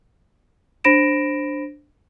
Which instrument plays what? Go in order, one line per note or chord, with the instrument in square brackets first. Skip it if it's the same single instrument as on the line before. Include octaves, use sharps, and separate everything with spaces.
[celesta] D4 C5 B5 A#6 D7 E7